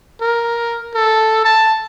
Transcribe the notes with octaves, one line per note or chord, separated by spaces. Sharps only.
A#4
A4
A5